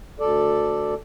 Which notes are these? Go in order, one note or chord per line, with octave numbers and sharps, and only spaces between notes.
D2 A4 D5